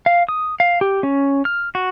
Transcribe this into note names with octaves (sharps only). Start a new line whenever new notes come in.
F5
D#6
F5
G4
C#4
F6
F#4